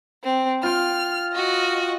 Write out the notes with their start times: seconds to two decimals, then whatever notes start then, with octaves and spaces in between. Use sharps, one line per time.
0.23 C4
0.63 F4 G5 F6
1.33 F#4 D#5